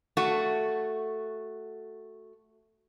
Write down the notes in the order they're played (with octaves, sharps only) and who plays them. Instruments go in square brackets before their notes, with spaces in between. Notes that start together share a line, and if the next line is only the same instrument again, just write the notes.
[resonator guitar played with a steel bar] A3 F#4